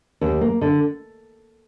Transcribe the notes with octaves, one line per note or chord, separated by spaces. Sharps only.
D#2
A#3
D3